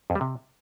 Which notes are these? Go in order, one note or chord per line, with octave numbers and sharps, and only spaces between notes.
F2
G3
C3